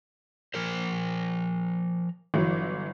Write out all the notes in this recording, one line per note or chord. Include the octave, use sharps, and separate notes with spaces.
F3 A#4 C5
G1 E3 F#3